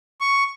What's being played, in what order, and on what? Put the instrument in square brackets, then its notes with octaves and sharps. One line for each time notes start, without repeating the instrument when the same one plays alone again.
[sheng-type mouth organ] C#6